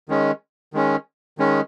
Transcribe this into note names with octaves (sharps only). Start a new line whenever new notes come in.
D#3 G#3 C#4
D#3 G#3 C#4
D#3 G#3 C#4